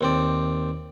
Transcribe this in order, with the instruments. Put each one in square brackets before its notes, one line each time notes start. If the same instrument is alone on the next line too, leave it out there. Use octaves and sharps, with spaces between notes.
[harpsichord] D#2 C4 D5